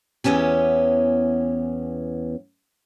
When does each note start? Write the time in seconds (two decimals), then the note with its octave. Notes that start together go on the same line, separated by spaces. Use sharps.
0.24 E2 E3 B3 C#4 G4